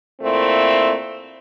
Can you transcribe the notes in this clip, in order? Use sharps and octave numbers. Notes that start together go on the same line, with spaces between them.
A#2 A3 C4 E4